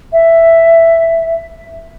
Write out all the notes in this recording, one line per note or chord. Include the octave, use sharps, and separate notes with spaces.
E5